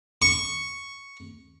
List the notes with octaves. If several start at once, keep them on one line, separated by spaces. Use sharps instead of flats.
C#6